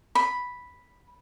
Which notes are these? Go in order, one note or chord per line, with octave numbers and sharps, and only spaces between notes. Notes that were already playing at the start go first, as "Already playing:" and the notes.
B5